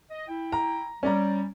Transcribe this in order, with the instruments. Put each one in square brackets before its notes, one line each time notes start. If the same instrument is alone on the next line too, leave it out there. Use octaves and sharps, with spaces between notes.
[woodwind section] D#5
E4 G5
[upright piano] A#5
[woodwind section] G3 [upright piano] C#4 D5 A#5